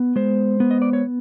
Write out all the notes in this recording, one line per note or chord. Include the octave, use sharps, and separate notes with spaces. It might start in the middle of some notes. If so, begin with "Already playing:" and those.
Already playing: B3
G#3 C5
B3
D#5
D5
C#5